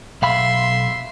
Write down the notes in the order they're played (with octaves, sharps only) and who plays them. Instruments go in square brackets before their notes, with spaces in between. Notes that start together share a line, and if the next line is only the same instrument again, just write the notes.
[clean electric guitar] B1 F5 B5 [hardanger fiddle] E5 C6